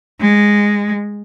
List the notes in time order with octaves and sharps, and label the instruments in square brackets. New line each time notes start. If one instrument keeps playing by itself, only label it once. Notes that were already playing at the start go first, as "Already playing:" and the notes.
[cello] G#3